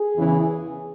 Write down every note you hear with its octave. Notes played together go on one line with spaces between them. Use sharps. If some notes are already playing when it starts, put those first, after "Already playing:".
Already playing: G#4
E2 C#3 E3